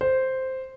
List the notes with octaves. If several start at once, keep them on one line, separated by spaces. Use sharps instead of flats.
C5